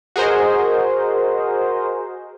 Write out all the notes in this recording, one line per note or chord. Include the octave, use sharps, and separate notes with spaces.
F#4 G#4 A#4 C5 D#5